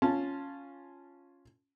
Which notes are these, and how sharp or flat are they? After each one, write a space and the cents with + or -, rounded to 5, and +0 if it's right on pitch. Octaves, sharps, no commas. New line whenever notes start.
C#4 +0 F4 +0 A5 -5